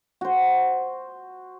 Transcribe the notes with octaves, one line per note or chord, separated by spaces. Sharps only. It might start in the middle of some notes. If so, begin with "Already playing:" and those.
F#4 C5